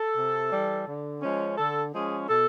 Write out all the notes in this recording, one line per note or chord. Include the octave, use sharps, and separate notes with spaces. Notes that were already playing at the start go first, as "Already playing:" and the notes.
Already playing: A4
C3
E3 G3
D3
F3 G#3 C#4
D3 A4
F3 G#3 C#4 G#4
B2 A4